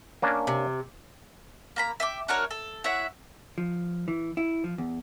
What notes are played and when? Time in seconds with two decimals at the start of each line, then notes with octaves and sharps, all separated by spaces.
0.22 A#3 C#4 D4
0.47 C3
1.76 A#3 A#5 B5
2.00 E5 G5 D6
2.28 D4 F#4 A#4 C#5
2.51 A4
2.84 E4 C#5 E5 F#5
3.58 F3
4.08 E3
4.37 E4
4.64 F3
4.78 E2